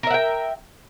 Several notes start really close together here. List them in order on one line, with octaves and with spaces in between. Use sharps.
A#4 E5 F#5 G5